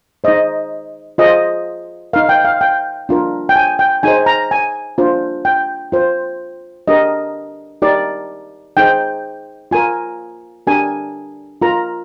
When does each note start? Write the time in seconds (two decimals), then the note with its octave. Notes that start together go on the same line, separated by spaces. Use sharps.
0.24 D#4 G#4 C5 D#5
1.18 F4 G#4 C5 D#5
2.13 D#4 A#4 F5
2.29 G5
2.45 F5
2.61 G5
3.09 D4 F4 A#4
3.49 G5
3.56 G#5
3.79 G5
4.03 D#4 G#4 C5 G#5
4.26 A#5
4.51 G#5
4.98 D4 F4 C5
5.45 G5
5.92 F4 C5
6.88 D4 G4 A#4 D#5
7.82 D#4 G4 A#4 D5
8.77 D#4 G#4 C5 G5
9.71 F4 A#4 G#5
10.67 D4 G4 A#4 G#5
11.62 F4 A#4 A#5